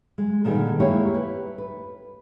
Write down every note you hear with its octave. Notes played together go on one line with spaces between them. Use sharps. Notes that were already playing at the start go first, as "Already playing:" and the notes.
G#3
A#2 D3 D#3 G3 B3 G#4
G#3 A#3 C4 E4 G4 C#5
B4
B4